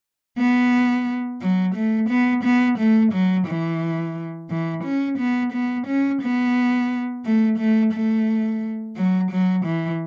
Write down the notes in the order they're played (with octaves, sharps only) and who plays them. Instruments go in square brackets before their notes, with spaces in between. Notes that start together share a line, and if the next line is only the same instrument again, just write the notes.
[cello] B3
F#3
A3
B3
B3
A3
F#3
E3
E3
C#4
B3
B3
C#4
B3
A3
A3
A3
F#3
F#3
E3